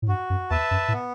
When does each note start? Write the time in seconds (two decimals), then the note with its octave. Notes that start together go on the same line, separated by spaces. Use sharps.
0.02 A2
0.08 G2 F#4
0.30 F#2
0.50 E2 B4 E5 A5
0.71 F#2
0.88 A2
0.93 B3